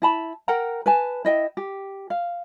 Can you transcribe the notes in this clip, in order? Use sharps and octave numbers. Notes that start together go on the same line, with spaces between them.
E4 A5 B5
A#4 F#5 G5 A#5
B4 G#5 A5
E4 D#5 G5
G4
F5